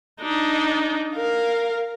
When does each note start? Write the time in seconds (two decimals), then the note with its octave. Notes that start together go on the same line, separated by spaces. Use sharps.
0.21 D4 D#4
1.15 A#4 F5